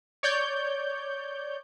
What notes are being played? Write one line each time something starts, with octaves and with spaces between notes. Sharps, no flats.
C#5 D5 G6